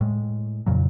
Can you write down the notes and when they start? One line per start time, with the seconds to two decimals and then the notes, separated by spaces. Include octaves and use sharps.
0.01 A2 G#3
0.66 F2 A#2 C#3 F#3